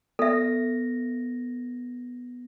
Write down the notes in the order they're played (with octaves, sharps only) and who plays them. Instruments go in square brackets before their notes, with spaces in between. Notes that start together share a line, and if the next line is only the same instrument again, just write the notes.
[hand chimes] B3 A#6 [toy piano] A4 E5